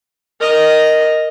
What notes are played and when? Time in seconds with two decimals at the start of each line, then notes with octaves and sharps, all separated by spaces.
0.40 A#4 D#5